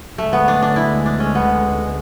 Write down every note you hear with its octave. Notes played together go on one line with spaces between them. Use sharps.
D2 D3 G#3 A3
B3
D4
D4
E4
D4
C#4
B3